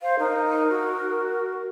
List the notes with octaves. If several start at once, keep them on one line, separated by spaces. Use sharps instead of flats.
C5 F5
D#4 A#4
F#4